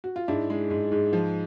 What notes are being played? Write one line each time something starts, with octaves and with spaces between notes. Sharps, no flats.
F#4
F4
G#2 D4 E4
G#3
G#2
G#2
F3